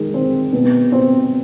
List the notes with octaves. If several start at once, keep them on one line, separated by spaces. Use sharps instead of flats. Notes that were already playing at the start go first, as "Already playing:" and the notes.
Already playing: D#3 G#3
C4
B2
C4